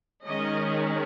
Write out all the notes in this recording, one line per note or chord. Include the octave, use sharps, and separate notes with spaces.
D#3 G#3 C#4 D#5